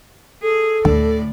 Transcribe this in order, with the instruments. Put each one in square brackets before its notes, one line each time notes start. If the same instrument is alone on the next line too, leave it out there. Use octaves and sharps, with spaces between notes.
[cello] G#4 [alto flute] A4
[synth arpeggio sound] D2 [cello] A2 D5 [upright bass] D3